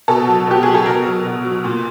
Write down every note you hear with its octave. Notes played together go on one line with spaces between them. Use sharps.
B2 A4
F#3
B2 G4
F#3 G#4
A4
B2 A#4
F#3
B2
F#3
A#2